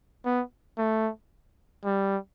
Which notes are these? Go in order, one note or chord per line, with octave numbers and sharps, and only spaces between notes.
B3
A3
G3